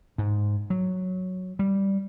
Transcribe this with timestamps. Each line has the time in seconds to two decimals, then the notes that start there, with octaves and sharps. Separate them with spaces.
0.18 G#2
0.70 F#3
1.59 G3